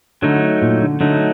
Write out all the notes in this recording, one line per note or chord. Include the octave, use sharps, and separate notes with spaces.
D3 F#3 A3 D#4
A#2
D3
D3 F#3 A3 D#4